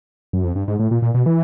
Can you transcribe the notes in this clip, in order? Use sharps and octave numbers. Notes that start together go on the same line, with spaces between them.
F#2
F2
G2
G#2
A2
A#2
A#2
B2
E3